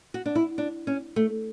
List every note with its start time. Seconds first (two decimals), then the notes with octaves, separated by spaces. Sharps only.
0.14 F#4
0.26 D4
0.35 E4
0.58 D4
0.87 C#4
1.16 A3